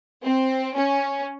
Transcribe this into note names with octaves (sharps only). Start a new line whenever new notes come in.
C4
C#4